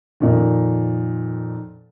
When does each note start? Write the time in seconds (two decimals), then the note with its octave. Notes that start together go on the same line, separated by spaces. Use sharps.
0.20 F2 A#2 D#3